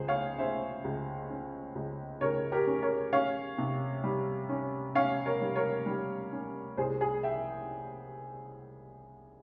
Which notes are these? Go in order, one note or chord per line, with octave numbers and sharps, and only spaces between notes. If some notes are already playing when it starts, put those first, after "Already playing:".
Already playing: C#2 G#4 C5
C#5 F5
C#4 C5 E5
C#2
C#4
C#2
C#3 A#4 C#5
G4 A#4
C#4
A#4 C#5
C#4 C#5 F5
C3
G3
C#4
C#4 C#5 F5
A#4 C#5
G3
A#4 C#5
G3
C#4
C2 G#4 C5
G#4
E5 G5